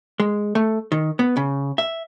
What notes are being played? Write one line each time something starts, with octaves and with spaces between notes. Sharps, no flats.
G#3
A3
D#3
B3
C#3
E5